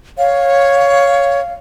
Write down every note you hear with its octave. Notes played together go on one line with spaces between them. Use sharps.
C#5 F5